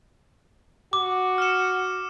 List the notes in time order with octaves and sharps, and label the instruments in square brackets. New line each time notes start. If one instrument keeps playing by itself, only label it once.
[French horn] F#4 [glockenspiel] D6
[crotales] F6 C#7 E7